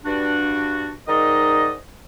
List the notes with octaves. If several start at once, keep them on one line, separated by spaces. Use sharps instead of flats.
G2 D4 F#4
G#2 D#3 D#4 D5 D#5